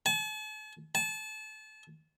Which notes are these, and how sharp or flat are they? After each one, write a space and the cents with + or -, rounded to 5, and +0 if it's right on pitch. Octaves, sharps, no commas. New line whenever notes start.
A5 -45
A5 -30